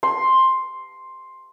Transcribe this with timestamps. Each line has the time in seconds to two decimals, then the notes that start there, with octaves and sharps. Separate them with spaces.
0.03 C6